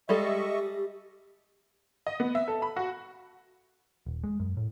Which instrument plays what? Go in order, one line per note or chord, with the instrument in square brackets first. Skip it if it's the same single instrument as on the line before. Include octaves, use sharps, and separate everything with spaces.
[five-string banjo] G3 G#3 A4 [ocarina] G4 [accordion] D#5 E5 C#6
[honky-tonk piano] D#5
B3
E5
A4
B5
F#4
[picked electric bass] D#1
G#3
F#2
A2